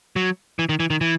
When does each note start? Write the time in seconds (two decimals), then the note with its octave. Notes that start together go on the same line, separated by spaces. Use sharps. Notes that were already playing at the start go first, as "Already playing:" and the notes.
0.16 F#3
0.59 E3
0.69 D#3
0.80 E3
0.90 D#3
1.01 E3